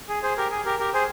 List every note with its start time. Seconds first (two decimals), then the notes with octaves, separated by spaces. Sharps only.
0.09 G#4
0.23 G#4 C5
0.37 G4 A#4
0.51 G#4
0.65 G4 A#4
0.80 G4 A#4
0.94 G#4 C5